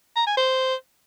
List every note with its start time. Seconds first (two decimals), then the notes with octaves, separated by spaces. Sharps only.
0.16 A#5
0.27 G#5
0.37 C5